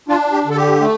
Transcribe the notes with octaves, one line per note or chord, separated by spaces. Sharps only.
D4 F4
G4
D3 A4
G4
A3